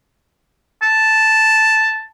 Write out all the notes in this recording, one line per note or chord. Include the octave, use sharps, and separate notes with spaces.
A5